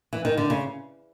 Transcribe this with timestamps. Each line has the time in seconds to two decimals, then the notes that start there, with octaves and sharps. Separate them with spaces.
0.13 E3
0.25 D#3
0.37 D3
0.50 C#3